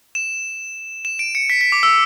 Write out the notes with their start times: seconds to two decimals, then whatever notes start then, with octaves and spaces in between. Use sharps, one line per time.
0.15 E7
1.05 E7
1.19 D7
1.35 C#7
1.50 B6
1.61 B6
1.72 D6
1.83 E6